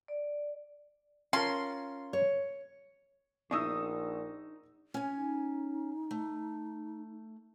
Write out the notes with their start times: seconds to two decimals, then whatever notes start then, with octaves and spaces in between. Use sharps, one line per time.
0.08 D5
1.33 C#4 F4 A#4 C6
2.13 C#5
3.51 A#1 D4 D#4 C#6 D#6 E6
4.94 C#4 G#5
5.15 D#4
6.11 A3